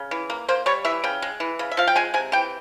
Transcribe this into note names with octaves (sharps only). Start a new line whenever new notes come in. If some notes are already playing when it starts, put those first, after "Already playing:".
Already playing: C#3
E3
A#3
A#3 C5
G3 C#5
E3 E5
C#3 G5
G#3
E3
C#3
E5
F3 F5
G5
G#3 G#5
C3 G#5
E3 G5